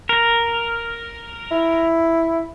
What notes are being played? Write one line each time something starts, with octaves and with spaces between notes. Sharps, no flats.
A#4
E4